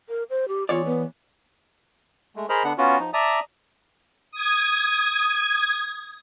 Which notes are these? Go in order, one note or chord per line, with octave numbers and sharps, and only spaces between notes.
A#4
C5
G4
E2 F4 C#5 D5
B3
G#3 A3
G#4 A#4 C5 D#5 B5 F6
D3 B3 D4 F#5
B3 C#4 F4 F#4
F3 D#4
D5 E5 A5 A#5 D#6
D#6 G#6